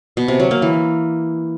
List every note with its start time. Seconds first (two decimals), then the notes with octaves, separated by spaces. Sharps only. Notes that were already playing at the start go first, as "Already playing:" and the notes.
0.17 B2
0.28 C3
0.40 F#3
0.51 A#3
0.62 E3